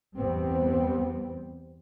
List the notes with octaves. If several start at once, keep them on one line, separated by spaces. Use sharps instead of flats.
E2 G2 G3 B3 C4